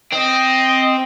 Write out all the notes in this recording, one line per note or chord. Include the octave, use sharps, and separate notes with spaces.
C4 D#5